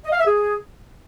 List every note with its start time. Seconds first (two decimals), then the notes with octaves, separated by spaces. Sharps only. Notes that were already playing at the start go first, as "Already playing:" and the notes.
0.04 D#5
0.11 F5
0.19 E5
0.26 G#4